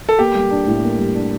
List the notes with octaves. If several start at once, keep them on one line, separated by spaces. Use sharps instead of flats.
A4
A#3 G4
G3
D4
A2
A#3
G3
D4